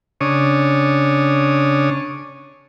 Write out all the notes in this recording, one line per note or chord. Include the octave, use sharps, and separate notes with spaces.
C#3 D4 C#5 D#6